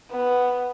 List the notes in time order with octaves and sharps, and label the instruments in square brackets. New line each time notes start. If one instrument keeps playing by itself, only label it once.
[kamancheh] B3